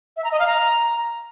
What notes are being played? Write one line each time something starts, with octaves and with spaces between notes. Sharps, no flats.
E5
A#5
D#5
F5
A#5